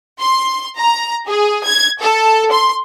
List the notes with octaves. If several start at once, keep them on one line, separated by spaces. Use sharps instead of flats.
C6
A#5
G#4
G#6
A4
C6